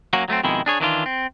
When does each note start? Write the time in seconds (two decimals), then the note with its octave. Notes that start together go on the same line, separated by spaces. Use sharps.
0.13 F#3 A#3 C#4 F#4
0.28 F#3 A3 B3 C4
0.44 F2 B2 D#3 G#3 E4
0.66 D4 G#4 C#5
0.80 D#3 E3 D4 F4
1.06 C4